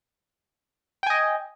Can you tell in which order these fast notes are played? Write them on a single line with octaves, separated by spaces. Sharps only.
G5 G#5 D#5